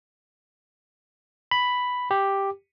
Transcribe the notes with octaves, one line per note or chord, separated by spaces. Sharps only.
B5
G4